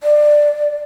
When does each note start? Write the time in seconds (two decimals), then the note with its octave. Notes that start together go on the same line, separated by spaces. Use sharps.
0.03 D5